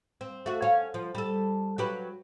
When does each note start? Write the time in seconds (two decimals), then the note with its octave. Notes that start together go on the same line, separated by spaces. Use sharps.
0.21 C4
0.46 A3 F#4
0.62 C#4 F5
0.94 F3
1.15 G3 A4
1.78 F#3 G4 B4